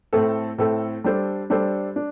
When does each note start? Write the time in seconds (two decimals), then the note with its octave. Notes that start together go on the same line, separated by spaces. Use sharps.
0.13 A2 A3 C4 A4
0.58 A2 A3 C4 A4
1.04 G3 D4 A4 C5
1.50 G3 D4 A4 C5
1.96 D4